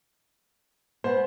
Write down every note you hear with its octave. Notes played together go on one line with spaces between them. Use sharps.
G#3 B3 C5